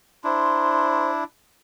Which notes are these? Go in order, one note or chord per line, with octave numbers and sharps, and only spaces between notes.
D4 E4 C5 A#5 C6